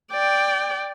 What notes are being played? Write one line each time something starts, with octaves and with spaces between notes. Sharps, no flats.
D5 G5